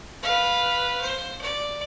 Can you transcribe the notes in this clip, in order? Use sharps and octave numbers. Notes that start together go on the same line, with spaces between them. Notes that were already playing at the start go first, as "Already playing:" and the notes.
B4 F5
C5
D5